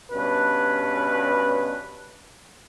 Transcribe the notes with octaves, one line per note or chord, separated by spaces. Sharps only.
G2 B2 C#4 B4